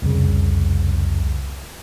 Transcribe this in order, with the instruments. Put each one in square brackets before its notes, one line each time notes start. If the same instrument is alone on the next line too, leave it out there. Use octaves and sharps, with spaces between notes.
[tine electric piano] C2 F2 C#3